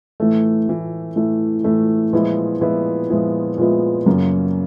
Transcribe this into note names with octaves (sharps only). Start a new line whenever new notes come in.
A2 E3 A3
A2 E3 A3
A2 E3 A3
A2 E3 A3
A#2 F3 G#3 B3 E4
A#2 F3 G#3 B3 E4
A#2 F3 G#3 B3 E4
A#2 F3 G#3 B3 E4
F#2 C#3 F#3 A#3